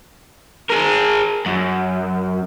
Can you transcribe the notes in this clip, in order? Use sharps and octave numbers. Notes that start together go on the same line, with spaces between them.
G#4 A#4
F#2